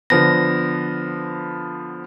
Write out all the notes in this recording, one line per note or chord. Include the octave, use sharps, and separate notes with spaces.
D3 F3 B3 A#6